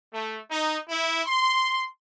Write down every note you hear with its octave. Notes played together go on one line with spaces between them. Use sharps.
A3
D#4
E4
C6